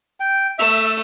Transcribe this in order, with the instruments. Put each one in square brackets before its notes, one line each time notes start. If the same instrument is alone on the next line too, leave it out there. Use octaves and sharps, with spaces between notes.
[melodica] G5
[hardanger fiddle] A3 [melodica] E5